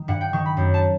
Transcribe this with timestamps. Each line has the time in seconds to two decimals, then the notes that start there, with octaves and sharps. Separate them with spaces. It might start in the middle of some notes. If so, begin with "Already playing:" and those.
Already playing: D#3
0.08 G2 F#5
0.21 G5
0.33 D#3 C#6
0.46 B5
0.57 F#2
0.74 A5